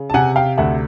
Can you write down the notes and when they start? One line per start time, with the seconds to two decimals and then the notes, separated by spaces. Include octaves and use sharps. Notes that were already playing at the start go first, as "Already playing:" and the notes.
Already playing: C#3
0.10 A5
0.14 C3 F#5 G#5
0.36 F5 G5
0.58 D2 E5 F#5